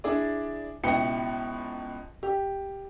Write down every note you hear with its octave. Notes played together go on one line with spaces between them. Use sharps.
D4 E4 G#4 D5
C#2 B2 E4 B4 G5 C#7
G4